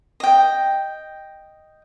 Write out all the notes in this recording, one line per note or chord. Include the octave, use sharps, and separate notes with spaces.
D#5 G5